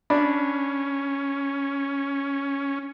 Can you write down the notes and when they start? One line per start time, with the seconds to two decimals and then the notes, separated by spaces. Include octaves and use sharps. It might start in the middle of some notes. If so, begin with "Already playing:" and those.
0.10 C#4 D4 B5